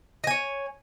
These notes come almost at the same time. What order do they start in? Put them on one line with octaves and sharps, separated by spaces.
D#5 G#5 C#5